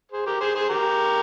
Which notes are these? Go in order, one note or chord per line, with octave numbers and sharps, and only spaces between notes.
G#4 C5
G4 A#4
G#4 C5
G#4 C5
G4 A#4